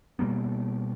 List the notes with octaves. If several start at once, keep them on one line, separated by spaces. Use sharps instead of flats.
B2 G3 A#3 B3